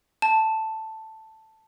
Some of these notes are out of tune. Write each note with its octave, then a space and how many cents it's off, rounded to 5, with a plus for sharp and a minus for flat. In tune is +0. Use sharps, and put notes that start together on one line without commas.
A5 +5